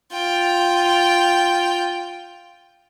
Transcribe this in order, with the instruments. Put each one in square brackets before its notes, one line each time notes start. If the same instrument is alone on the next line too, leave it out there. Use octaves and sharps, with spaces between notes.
[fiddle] F4 G5